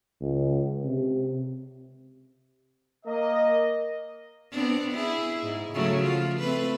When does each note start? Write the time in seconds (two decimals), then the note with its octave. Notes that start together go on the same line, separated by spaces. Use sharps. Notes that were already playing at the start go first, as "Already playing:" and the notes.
0.21 C#2
0.84 C3
3.06 A#3 D#5
4.52 B3 C4 D4
4.92 E4 G#4
5.43 G#2
5.73 C#3 F#3 A3
6.03 F3 F4
6.40 A3 C4 B4